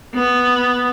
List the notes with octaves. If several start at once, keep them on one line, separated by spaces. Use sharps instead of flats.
B3